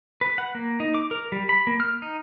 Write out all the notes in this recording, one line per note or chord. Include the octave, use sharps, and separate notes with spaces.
B4
F#5
A#3
D#4
D6
A#4
G3
B5
A#3
F6
D#4